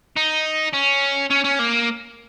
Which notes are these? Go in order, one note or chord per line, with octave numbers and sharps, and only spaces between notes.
D#4
C#4
C#4
C#4
A#3